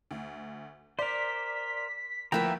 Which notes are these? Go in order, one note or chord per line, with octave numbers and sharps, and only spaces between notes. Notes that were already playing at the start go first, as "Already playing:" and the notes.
D2
A#4 C5 D5 B6
D2 F3 A#3 E4 B4 E5 G5 A#5